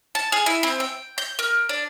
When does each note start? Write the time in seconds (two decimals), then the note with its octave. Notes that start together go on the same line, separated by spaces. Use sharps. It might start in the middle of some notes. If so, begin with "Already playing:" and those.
0.15 A5
0.32 G#4
0.46 E4
0.63 C4
0.80 G5
1.18 G6
1.39 A#4
1.69 D4